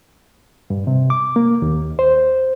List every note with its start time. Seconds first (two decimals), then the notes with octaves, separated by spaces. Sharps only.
0.70 G2
0.87 C3
1.10 D6
1.36 A#3
1.62 D#2
1.99 C5